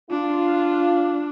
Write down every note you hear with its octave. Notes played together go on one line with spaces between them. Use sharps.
D4 F4